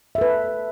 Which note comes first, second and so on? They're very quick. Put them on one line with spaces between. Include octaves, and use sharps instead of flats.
E5 A4 B4